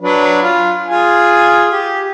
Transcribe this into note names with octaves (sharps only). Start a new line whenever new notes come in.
F#3 D4 B4
F4
F4 G#4 G#5
G4